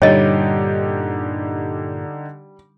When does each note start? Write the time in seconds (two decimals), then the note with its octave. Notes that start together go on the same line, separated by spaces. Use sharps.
0.02 G2 A#2 D3 G3 D#4 G4 C#5 D#5